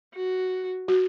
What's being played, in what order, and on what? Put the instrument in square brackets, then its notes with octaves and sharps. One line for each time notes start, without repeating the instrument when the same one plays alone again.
[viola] F#4
[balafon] F#4